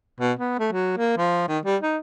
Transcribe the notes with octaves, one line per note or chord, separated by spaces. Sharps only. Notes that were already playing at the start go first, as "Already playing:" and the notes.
B2
B3
A3
F#3
A#3
F3
D#3
G3
D#4